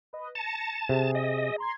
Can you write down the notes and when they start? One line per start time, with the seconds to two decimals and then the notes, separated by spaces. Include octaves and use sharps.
0.13 B4 D#5
0.35 A5 A#6 C#7
0.89 C3 G#4
1.15 D#5
1.58 A#5 C6 G#6